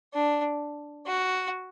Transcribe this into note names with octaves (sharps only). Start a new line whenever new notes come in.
D4
F#4